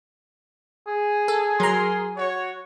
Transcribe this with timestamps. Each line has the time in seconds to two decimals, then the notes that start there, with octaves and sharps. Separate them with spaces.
0.87 G#4
1.28 A4
1.60 F#3 A#4 A#5 C6
2.17 F#4 C#5